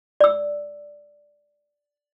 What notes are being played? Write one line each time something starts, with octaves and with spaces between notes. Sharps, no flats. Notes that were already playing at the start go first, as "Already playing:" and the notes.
D5 E6